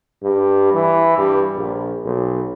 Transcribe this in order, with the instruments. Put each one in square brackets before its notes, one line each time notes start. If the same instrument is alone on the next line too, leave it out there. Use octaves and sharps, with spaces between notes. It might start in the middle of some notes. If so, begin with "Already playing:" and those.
[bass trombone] G2
E3
G2
A#1
B1